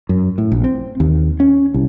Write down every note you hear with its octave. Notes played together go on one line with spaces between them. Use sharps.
F#2
A2
A#1
C4
D#2
C#4
C2